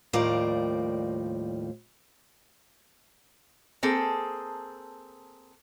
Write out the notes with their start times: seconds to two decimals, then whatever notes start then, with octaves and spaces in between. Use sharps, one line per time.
0.13 D#2 A2 F3 G3 A#4 D5
3.83 A#3 C4 G#4 A4